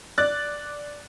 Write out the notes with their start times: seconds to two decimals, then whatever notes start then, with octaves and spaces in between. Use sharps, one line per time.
0.18 D5 F#6 A6